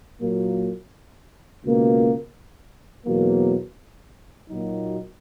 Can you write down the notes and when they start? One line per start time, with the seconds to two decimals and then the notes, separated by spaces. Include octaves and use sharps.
0.21 A#2 F#3 A#3
1.64 C#2 B2 A#3
3.06 E2 B2 F#3 A#3
4.49 A#2 F#3 A#3 D#4 F#4